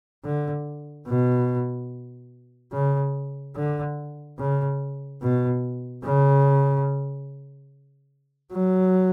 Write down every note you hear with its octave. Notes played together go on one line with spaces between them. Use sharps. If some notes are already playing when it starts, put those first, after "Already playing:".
D3
B2
C#3
D3
C#3
B2
C#3
F#3